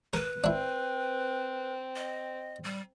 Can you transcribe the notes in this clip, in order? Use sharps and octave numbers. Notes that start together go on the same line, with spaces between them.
A#4 B4
C4 D4 E4
D#5
G3